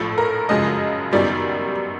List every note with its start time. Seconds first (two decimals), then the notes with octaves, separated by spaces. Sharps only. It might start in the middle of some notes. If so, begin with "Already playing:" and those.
Already playing: A#1 A2 F3 A4
0.18 A#4
0.49 F#2 C#3 F3 G#3 D#5
1.12 F#2 D#3 G3 B3 D5